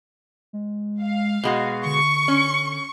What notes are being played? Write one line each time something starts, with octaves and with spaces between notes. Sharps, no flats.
G#3
F5
B2 G#3 F#4
D3 C#6
C#4